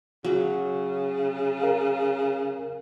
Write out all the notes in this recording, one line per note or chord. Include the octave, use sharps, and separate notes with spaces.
C#3 F#3
A#4 F5